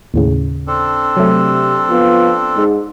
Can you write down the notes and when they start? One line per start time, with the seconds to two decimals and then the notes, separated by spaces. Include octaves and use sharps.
0.14 D#2 A2 C#3
0.67 C4 D4 A4
1.17 C3 F#3 A3
1.90 F3 B3 F4
2.56 G#2